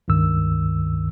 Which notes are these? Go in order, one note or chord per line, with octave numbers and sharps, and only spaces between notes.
C#2 G2 D#3 E6